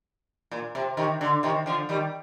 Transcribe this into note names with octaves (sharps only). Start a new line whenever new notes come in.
A#2
C3
C3 D#3
D3
C3 D#3
D3 F3
D#3 G3